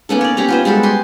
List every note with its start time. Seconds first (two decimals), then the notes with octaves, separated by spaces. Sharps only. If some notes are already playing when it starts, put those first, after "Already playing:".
0.09 A#3 B3 C#4 A4
0.21 C#5 D5
0.37 C#4 G4 C#5 A#5
0.49 B3 F4 C5
0.65 G3 G#3 F#4 A4
0.83 G4 G#5 C6